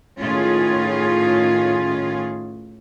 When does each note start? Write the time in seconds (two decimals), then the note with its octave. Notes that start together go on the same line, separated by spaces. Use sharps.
0.22 A2 D#3 C#4 F4 G#4